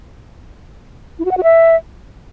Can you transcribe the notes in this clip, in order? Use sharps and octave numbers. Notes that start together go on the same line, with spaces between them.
E4
F#4
F#5
F#4
E5